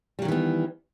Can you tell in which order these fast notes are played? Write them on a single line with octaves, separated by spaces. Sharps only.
G3 F#3 D#3 E3 B3